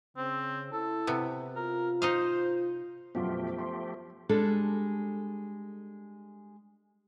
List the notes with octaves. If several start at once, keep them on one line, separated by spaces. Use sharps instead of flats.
C#3 C4
E4 A4
C3 B3
F4 A#4
D#4 C5 D#5 F5
F#2 B2 F3 A3 B3 F4 G4
C6
G3 G#3 D4 A4